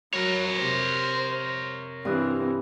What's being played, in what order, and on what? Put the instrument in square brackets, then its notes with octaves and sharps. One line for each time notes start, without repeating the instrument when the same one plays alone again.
[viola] F#3 [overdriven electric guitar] A#4 C#5 [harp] B5
[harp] C3 [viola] C5
[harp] G2 D#6 F#6 [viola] E3 C4